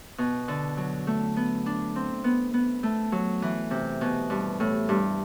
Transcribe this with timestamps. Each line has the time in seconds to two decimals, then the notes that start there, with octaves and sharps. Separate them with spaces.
0.18 B2
0.48 D3
0.77 F#3
1.07 A3
1.36 B3
1.66 D4
1.96 C4
2.24 B3
2.54 B3
2.83 A3
3.12 F#3
3.42 E3
3.71 C3
4.01 B2
4.30 G2
4.60 A2
4.89 G2